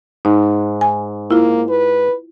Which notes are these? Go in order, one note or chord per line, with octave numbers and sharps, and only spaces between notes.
G#2 D#4
G#5
A#3 E4 F4
B4